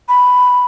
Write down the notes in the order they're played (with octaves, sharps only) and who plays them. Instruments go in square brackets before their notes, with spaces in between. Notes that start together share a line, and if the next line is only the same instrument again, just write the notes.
[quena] B5